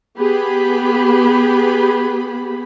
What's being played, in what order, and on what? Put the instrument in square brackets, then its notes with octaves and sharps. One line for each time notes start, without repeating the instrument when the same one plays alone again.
[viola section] B3 G4 G#4 B5